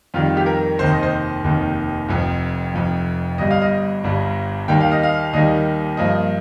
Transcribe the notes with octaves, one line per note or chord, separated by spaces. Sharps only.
F2 D#3 G3 F4
G4
A#4
F1 D#2 D#3 C5
D#5
C5
F1 D#2 D#3
F1 F2 F3
F1 F2 F3
G1 G2 G3 D#5
F5
D#5
G1 G2 G3
D#2 D#3 G3 A#3 G5
F5
D#5
F5
D#2 D#3 G3 A#3 D#5
G2 F3 A#3 D#5